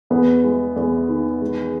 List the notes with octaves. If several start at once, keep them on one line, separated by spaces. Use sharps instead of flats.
E2 B3
G#3
E2
D#3
G#3